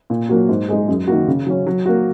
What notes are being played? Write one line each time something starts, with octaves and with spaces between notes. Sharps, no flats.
A#2
F#3 A#3 F#4
G#2
G#3 D#4 G#4
F#2
D#3 A#3 F#4
C#3
F#3 C#4
F#3
A#3 F#4